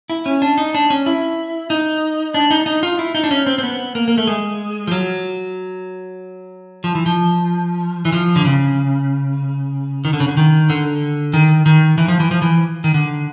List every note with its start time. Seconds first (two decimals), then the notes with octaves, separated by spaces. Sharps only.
0.10 E4
0.26 C#4
0.42 D4
0.58 D#4
0.75 D4
0.90 C#4
1.06 E4
1.70 D#4
2.34 D4
2.51 D#4
2.66 D#4
2.83 F4
2.99 E4
3.15 D#4
3.24 D4
3.31 C#4
3.47 C4
3.58 C4
3.63 B3
3.95 A#3
4.08 A#3
4.18 A3
4.27 G#3
4.87 F3
4.92 F#3
6.84 F3
6.95 E3
7.06 F3
8.05 E3
8.12 F3
8.36 D3
8.45 C#3
10.05 D#3
10.13 D3
10.20 C#3
10.28 D3
10.37 D#3
10.70 D3
11.33 D#3
11.66 D#3
11.98 E3
12.08 F3
12.20 E3
12.31 F3
12.42 E3
12.84 D#3
12.94 D3